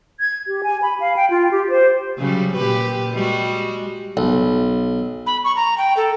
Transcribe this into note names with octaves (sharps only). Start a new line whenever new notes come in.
G#6
G4
G#5
B5
F5
G5
F4
G4
C5
C#3 F#3 G3
A#2 G4 B4
G3 G#3 F#4
B1
B5
C#6
A#5
G5
A4